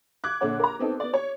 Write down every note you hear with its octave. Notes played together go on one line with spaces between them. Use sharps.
D6 F#6 G#6
A#1 D3 D4 C#5 F#5
A#4 A#5
B3 C4 D#4 A4
B3 D5
C#5